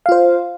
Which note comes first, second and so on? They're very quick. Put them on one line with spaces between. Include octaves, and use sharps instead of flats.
F5 F4 C5